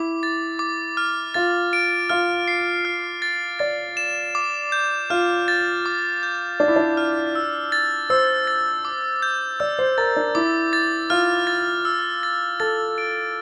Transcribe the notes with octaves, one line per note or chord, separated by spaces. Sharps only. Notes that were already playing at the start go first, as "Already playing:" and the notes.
Already playing: E4 D6
A6
D6
F6
F4 A6
D7
F4 F6
C7
F6
A6
D5 A6
E7
D6
G6
F4 F6
A6
D6
G6
D4 D6
E4
D4
F6
E6
A6
C5 E6
A6
D6
G6
D5 E6
C5
A#4 A6
D4
E4 D6
A6
F4 F6
A6
E6
A6
A4 A6
D7